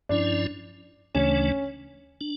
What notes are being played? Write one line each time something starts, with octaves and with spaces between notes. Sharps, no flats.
G2 F3 C#4 D4 E4
D2 C#3 E3 A3 C#4 D4
D4